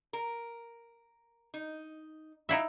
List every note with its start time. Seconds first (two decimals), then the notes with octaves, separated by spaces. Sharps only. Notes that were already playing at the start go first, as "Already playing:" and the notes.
0.13 A#4
1.54 D#4
2.49 F#3 D#4 E4 E5 F5 G5